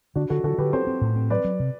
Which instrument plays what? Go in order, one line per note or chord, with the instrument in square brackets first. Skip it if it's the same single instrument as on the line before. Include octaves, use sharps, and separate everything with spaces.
[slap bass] D3 [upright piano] D4 F#4
[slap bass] D3 [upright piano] F#4 A4
[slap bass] D3 [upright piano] F#4 A4
[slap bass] D3 [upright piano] G4 B4
[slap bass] C4 [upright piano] A4 C5
[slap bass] C4
A2
C4
[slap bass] F#3 [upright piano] B4 D5
[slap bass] F#3
C3